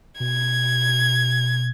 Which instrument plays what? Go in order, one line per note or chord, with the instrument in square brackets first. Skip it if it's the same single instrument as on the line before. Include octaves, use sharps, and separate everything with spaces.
[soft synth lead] B2 [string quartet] G#6